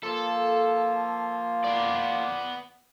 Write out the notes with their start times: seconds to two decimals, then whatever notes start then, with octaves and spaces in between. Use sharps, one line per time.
0.03 F3 A#3 F4 A4
1.65 B3 D5